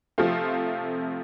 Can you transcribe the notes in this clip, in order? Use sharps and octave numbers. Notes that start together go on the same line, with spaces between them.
C3 F3 A3 C4 F4